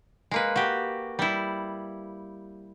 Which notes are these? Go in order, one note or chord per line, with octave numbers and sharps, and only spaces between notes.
G#3 A#3 B4
F#4 G4
G3 E4